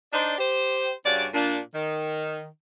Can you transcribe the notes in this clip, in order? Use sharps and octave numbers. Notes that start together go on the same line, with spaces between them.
D4 D#4 C5 D5
G4 C5
G2 C#3 F#4 D5
A#2 D4
D#3